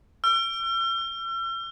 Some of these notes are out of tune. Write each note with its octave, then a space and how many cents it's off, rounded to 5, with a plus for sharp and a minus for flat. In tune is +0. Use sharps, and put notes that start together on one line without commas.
E6 +45